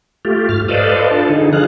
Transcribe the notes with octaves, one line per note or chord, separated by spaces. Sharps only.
A3 F4 G4
G#2 F6
A4 B4 C5 D5 D#5 F5
D4 F4 A4 A5
D3 D#4 G#4
F3 G#4 F5 F#6